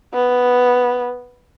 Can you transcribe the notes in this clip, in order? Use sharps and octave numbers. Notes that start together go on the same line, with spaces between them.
B3